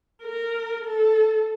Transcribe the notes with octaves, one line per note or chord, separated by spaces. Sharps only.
A#4
A4